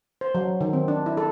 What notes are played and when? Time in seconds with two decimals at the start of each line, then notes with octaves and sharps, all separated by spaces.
0.21 C5
0.35 F#3
0.61 D#3
0.73 C4
0.88 D4
1.06 E4
1.17 A4